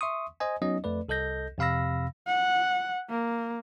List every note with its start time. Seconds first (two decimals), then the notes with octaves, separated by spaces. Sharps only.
0.01 E5 C6 C#6 D#6
0.40 C5 D#5 G#5
0.62 F#3 B3 C#4 D#4 D#5
0.84 F2 A3 B4 D5
1.09 C2 A4 D#5 G6 A#6
1.58 F2 C3 F5 B5 E6 A#6
2.27 F#5
3.10 A#3